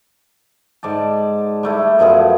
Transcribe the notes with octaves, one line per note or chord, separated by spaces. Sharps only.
G#2 D5 A5
G3 A3 E4
F#2 B2 F3 G#4